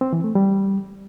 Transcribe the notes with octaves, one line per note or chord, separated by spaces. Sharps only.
C4
E3
A3
G3